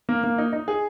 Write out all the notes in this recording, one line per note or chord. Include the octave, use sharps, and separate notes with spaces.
A#3
A#3
D#4
D#4
G#4